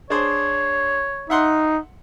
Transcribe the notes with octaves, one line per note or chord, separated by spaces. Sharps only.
D4 G#4 C5 C#5
D#4 E5 F#5 C6